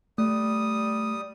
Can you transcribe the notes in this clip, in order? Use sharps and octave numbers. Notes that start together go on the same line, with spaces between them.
G3 A3 D#6